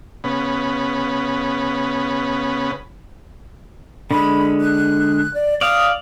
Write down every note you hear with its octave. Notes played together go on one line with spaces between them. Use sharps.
C#3 B3
D3 G#3 B5
F#6
D5
D5 F5 D#6